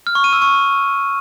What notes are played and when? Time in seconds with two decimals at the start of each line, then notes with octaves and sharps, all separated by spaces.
0.07 F6
0.15 C#6
0.24 D#7
0.33 E6
0.42 C#6